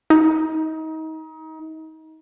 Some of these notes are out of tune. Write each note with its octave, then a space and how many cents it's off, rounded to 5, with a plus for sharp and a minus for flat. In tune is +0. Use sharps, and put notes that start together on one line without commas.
D#4 +30